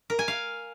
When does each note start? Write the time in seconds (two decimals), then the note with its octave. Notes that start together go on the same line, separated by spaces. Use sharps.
0.10 A#4
0.19 G#5
0.28 F5